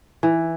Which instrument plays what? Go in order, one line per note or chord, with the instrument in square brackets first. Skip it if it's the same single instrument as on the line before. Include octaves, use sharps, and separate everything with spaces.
[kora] E3